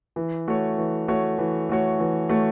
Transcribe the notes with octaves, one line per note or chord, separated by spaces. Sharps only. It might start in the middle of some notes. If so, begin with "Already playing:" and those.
E3
A3 F#4 C#5
E3
A3 F#4 C#5
E3
A3 F#4 C#5
E3
A3 F#4 C#5